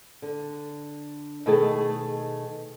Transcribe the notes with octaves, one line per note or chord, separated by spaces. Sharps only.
D3
B2 D#3 A3 G#4 C#5 A5